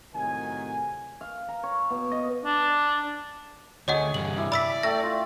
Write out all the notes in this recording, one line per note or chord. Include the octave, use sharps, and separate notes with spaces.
A2 C3 D#3 F#3 G#5
F5
A#5
C#5
B2
D#5
D4
D2 G#4 C#5 D#5 F#5 G#5 C#6
C2 G2 F#7
G3 E4
D5 B5 E6 B6
A3 G5 A#6
F4